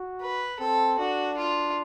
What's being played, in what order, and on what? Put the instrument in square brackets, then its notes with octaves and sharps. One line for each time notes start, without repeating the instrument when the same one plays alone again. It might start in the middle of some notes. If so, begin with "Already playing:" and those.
Already playing: [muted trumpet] F#4
[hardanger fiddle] B4
[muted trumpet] C4 [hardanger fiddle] A4
[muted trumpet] D4 [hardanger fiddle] F#4
[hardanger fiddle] F4